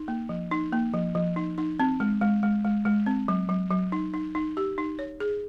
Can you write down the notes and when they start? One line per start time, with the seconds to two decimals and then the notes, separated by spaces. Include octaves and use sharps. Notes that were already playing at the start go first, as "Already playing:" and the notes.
Already playing: D#4
0.08 A#3
0.29 F3
0.51 D#4
0.73 A#3
0.93 F3
1.15 F3
1.36 D#4
1.58 D#4
1.80 C4
2.00 G#3
2.21 G#3
2.43 G#3
2.64 G#3
2.85 G#3
3.06 C4
3.28 F#3
3.49 F#3
3.71 F#3
3.92 D#4
4.14 D#4
4.35 D#4
4.57 G4
4.78 D#4
4.99 C#5
5.20 G#4